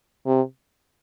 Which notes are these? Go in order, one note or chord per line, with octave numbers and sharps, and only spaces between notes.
C3